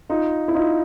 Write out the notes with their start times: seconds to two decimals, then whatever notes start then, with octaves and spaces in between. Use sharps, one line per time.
0.09 D#4 F4
0.48 E4
0.55 D#4 F4